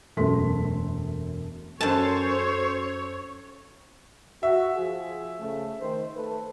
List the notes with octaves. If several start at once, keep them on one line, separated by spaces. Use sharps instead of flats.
E1 F#2 F#3 A3 C6 B6
F#2 A4 C5 C#5 A5
F#4 E5
F3 G#4
C#3 A3
D#3 C5
A3 A4 B4